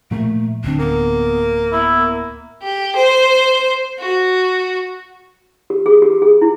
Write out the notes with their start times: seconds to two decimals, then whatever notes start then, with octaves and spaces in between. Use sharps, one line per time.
0.11 A#2 F3 A3 A#3
0.64 D1 D3 C4 D4
0.79 A#3 B3
1.73 B3 E4
1.98 A#3
2.62 G4
2.96 C5
3.99 F#4
5.70 G4
5.86 G#4
6.02 G4
6.22 G#4
6.42 E4